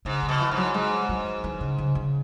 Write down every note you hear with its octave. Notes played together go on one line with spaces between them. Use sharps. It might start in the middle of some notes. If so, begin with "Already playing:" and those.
G#2 C#3
C#3
B2
E3
G#2
F#3
G#2 G#3
F#3
E3
C#3
C#3
C#3